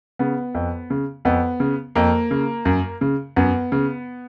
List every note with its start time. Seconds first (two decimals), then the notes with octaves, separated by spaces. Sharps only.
0.19 C#3 B3
0.55 F2
0.90 C#3
1.25 F2 B3
1.60 C#3
1.95 F2 A#3
2.31 C#3
2.65 F#2
3.01 C#3
3.36 F#2 B3
3.72 C#3